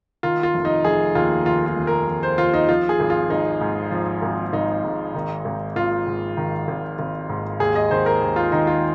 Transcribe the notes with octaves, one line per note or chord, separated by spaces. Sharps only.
D#3 F4
F4
F1
D#4
F1 G#4
D#2 F4
D#3 F4
F4
F1
A#4
F1
C5
D#2 F4
D#4
F3 F4
G#4
G#1
F4
G#1 D#4
G#2
F3
G#1
G#1 D#4
G#2
D#3
G#1
G#1 F4
G#2
D#3
G#1
G#1
G#2
D#2 G#4
D#5
D#3 C5
A#4
D#2
F4
D#3 D#4
F4